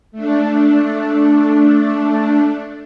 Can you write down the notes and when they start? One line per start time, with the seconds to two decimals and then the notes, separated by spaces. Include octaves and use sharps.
0.12 A3 D4